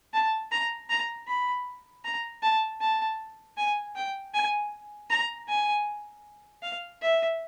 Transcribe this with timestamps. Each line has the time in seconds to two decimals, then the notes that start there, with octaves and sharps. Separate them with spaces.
0.14 A5
0.51 A#5
0.89 A#5
1.27 B5
2.05 A#5
2.42 A5
2.81 A5
3.57 G#5
3.95 G5
4.34 G#5
5.10 A#5
5.48 G#5
6.62 F5
7.01 E5